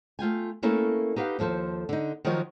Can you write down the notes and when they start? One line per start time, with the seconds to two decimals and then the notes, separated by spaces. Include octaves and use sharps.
0.19 A3 F4 G5 G#5
0.62 A3 A#3 C#4 E4 A4 A#4
1.16 D#4 G4 B4 F5 F#5
1.39 D#2 F3 A4 B4 C5
1.89 D3 D#4
2.25 D#3 F3 F#3 D#4 A#4 C#5